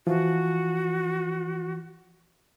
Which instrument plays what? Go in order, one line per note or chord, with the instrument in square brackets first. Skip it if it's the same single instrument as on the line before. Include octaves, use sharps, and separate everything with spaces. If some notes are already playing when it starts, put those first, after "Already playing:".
[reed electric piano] E3 F3 F4 [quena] F#4